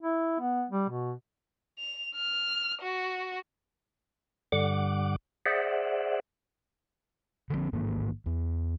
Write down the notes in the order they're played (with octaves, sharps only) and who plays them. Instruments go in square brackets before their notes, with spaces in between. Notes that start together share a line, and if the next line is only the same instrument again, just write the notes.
[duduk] E4
B3
G3
B2
[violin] F7
F6
F#4
[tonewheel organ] G2 D3 G3 F#5 D6
G#4 C5 D5 E5 F#5
[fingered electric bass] D3 F3 G#3 C4
A1 G#2 D#3 A#3
E2